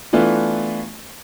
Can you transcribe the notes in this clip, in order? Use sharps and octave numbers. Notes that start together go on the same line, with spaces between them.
E3 A3 B3 D4 F4